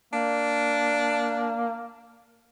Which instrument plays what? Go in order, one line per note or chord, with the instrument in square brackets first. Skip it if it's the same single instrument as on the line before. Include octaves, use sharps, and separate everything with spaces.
[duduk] A#3 [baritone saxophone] D4